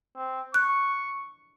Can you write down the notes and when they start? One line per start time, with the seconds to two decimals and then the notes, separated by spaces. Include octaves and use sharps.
0.16 C4
0.54 C#6 F#6